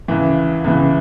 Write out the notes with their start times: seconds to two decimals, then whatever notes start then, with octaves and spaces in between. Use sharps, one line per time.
0.08 C#2 C#3 E3 E4
0.64 C#2 C#3 E3